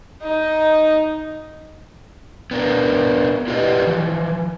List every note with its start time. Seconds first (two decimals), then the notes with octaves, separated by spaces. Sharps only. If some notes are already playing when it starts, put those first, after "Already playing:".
0.22 D#4
2.51 B3 D4 A#4
3.48 E4 F4 G4 B4 D5 D#5
3.87 E3 F3